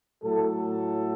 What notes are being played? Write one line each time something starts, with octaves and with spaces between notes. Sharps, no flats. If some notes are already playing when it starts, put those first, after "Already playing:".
A2 F#3 A3 A4